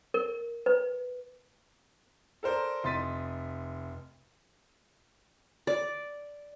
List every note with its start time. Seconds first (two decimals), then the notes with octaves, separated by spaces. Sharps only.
0.14 A#4
0.66 B4
2.43 A4 A#4 C5 D5
2.84 F1 D#5 C6 A6 B6 D#7
5.67 D5